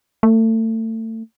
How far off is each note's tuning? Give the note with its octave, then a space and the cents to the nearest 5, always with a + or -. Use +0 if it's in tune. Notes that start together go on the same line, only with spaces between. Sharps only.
A3 +30